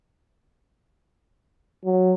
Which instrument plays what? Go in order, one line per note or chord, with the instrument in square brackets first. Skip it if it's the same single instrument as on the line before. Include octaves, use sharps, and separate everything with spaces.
[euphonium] F#3